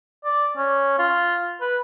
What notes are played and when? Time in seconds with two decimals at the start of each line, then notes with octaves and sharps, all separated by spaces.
0.25 D5
0.57 C#4
0.99 F4
1.61 B4